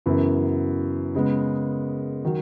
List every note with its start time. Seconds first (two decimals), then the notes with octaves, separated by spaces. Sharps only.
0.06 F#2 C#3 E3 B3 E4
1.15 C#3 G#3 B3
2.25 D#3 F#3